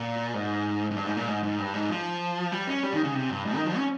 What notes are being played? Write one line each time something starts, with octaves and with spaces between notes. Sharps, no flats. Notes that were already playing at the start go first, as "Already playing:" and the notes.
Already playing: A#2
G#2
G#2
G2
G#2
A#2
G#2
G#2
G2
G#2
F3
G3
C#4
G3
D#3
C#3
C3
G2
G#2
D#3
F3
C#4